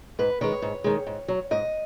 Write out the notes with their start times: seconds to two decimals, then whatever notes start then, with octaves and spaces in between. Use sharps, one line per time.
0.19 G#2 B4
0.41 D#3 G#3 C#5
0.62 G#2
0.84 D#3 G#3
1.07 G#2
1.28 F#3
1.51 G#2 D#5